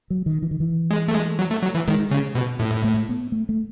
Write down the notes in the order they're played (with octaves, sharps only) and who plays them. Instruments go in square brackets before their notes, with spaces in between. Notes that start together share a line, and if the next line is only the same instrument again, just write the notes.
[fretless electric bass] F#3
D#3
E3
D#3
E3
[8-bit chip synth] G#3
A3
G#3
F#3
A3
F#3
E3
[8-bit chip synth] D#3 [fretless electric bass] G#3
[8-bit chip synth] C#3
B2
A2
[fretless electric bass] A3
B3
A3
A3